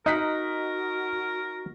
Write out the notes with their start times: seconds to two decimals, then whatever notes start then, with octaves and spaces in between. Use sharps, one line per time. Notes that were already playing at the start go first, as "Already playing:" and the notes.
0.06 D#4 F#4 A#4 D#5 F#6 B6